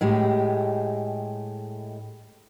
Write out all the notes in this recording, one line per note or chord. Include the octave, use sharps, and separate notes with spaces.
A2 G#3 G4